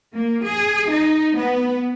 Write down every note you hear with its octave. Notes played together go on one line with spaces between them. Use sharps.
A#3
G#4
D#4
B3